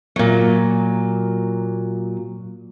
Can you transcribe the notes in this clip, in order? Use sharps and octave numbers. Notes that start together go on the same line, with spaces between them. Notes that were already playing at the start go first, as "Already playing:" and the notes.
A#2 F#3